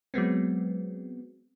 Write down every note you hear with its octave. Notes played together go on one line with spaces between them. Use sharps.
F#3 G#3 B3 C4